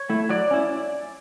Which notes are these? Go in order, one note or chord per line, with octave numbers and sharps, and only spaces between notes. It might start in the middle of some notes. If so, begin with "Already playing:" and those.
Already playing: C#5
A3 E4
F#3 D5
C#4 E4